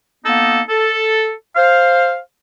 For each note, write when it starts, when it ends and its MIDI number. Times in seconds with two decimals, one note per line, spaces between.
0.24 0.60 58
0.24 0.60 59
0.24 0.60 63
0.24 0.60 69
0.69 1.31 69
1.56 2.18 72
1.56 2.18 77